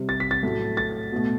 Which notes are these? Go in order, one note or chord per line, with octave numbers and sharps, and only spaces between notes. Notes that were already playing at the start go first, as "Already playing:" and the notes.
Already playing: C3 G3
A6
B6
A6
A2 F#3 A3
A6
B2 A3